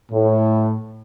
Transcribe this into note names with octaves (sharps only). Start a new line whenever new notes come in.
A2